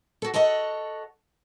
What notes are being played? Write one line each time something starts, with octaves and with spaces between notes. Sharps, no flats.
F#4 A4
F#4 A4 C#5 D#5 F#5